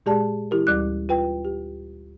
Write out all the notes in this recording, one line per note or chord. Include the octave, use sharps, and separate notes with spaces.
A#2 G#3 G4 G#4 D5 A5
E3 E4 G4 A#4
D2 G3 D6 F#6
F4 B4 G5
G4